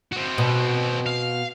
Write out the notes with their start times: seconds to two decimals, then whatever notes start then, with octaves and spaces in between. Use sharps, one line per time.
0.12 C4 F#4
0.38 B2
1.06 F5